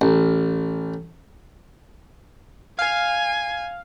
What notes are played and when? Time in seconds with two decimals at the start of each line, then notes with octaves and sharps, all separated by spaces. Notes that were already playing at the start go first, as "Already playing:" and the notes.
0.01 A1
2.79 F5 G#5